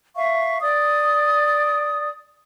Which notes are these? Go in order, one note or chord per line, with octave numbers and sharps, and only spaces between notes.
E5 F5 C#6
D5 D#6